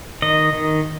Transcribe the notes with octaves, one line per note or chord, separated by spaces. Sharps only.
D#3 D#5
D#3